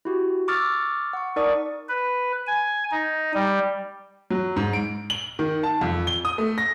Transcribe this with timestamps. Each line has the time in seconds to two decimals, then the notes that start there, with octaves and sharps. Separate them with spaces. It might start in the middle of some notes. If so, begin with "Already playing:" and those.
0.05 E4 F#4 G4
0.48 C#6 D6 E6 F6 A6
1.13 F#5 C#6
1.36 D#4 A#4 D5 A5 C#6 D#6
1.89 B4
2.47 G#5
2.91 D#4
3.34 G3
4.31 F#3
4.56 G#2
4.73 D7
5.10 F#7
5.39 D#3
5.63 A5
5.81 F2
6.07 G7
6.25 D#6
6.38 A3
6.58 A#6